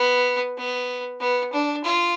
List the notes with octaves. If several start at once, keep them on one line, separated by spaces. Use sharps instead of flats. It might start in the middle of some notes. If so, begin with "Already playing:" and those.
Already playing: B3
B3
B3
D4
F4